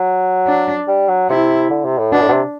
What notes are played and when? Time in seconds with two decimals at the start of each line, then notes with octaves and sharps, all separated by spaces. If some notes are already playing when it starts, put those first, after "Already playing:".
Already playing: F#3
0.47 D4
0.88 G3
1.08 F#3
1.30 C3 E4
1.70 D3
1.85 C3
1.99 A2
2.12 B2 D4
2.22 A2
2.29 B2
2.32 C3